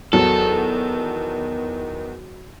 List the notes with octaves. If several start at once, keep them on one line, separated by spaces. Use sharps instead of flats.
E2 D#3 F#3 A4